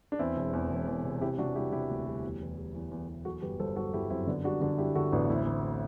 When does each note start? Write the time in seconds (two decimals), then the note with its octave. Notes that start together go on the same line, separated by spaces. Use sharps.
0.12 D4
0.19 E2 C4 E4
0.37 E1
0.53 E2
0.70 E1
0.87 E2
1.04 C3
1.21 C3 E4 G4
1.38 C3 D4 F#4
1.55 G3 E4 G4
1.72 C3 E4 G4
1.89 D2
2.07 G3
2.23 E2
2.41 E2
2.57 G3
2.75 E2
2.91 E2
3.08 E2
3.25 F#3 F#4 A4
3.42 G1 G4 B4
3.59 G1 A4 C5
3.76 F#3 F#4 A4
3.93 G1 E4 G4
4.10 F#2 C4 E4
4.27 D3 B3 D4
4.44 G3 D4 F#4
4.61 D3 D4 F#4
4.78 G3 E4 G4
4.95 D3 F#4 A4
5.12 A1 B3 D4
5.29 D2 C4 E4
5.46 D2